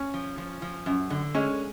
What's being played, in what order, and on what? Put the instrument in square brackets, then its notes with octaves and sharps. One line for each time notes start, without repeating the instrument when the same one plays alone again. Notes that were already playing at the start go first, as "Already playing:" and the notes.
Already playing: [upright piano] C#4
[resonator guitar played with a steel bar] F3
F3
F3
F#2
D3
[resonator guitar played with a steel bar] G#3 [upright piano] C#4